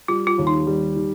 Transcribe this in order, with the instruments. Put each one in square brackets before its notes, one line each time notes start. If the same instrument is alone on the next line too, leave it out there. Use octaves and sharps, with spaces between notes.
[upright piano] G3 [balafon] F4
[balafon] F4
[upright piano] D#2
[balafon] D#4
[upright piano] G3
D#3